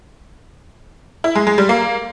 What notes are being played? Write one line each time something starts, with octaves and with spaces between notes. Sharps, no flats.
E4
G#3
G#3
G3
A#3